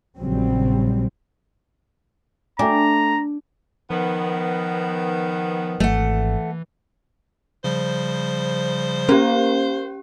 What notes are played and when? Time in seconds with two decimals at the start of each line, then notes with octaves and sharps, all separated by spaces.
0.17 A#1 A#2 C#3 F#3 G3 C4
2.59 A3 D4 G5 G#5 A#5
3.90 D#3 F3 B3
5.80 G#1 E3 A3 F#5
7.64 C#3 F3 G3 C5
9.09 A#3 C#4 G4